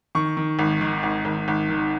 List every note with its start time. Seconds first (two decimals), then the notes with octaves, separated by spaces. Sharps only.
0.15 D#3 C#6
0.37 D#3
0.59 G#1
0.81 D#3
1.03 G#1
1.25 G#1
1.48 G#1
1.69 D#3